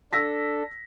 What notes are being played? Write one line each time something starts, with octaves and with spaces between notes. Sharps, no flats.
D4 A4 E6 A#6 B6